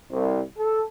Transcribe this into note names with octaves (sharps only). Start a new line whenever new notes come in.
C2
A4